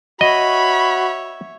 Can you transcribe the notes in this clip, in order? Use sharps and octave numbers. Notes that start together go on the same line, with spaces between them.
F#4 C#5 D#5 E5 B5